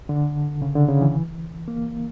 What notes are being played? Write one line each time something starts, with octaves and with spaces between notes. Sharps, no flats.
D3
C#3
D3
C#3
E3
A#3